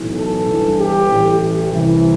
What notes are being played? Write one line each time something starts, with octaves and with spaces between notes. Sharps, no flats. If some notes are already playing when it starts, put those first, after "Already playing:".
Already playing: B1 A2 E3
A4
G1 G2 E3
G4
A1 A2 E3
C2 C3 E3